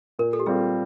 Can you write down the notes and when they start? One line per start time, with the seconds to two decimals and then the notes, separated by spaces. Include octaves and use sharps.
0.19 A#2 A#4
0.33 A4
0.40 G4
0.46 G3 C4 F4 G#4